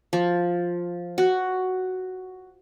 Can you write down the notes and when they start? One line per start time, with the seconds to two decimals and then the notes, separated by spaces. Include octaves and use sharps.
0.13 F3
1.18 F#4